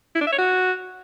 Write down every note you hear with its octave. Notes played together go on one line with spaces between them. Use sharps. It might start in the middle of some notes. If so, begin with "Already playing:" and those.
E4
D4
E5
C#5
F#4